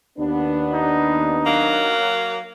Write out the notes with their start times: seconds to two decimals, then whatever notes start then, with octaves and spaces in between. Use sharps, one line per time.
0.18 D#2 B3 D4
0.73 D#4
1.46 F#3 A#3